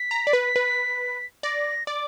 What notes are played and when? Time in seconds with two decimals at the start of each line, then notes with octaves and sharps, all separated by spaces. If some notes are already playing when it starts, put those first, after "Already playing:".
Already playing: B6
0.11 A#5
0.27 D5
0.33 B4
0.56 B4
1.43 D5 A#6
1.87 D5 D6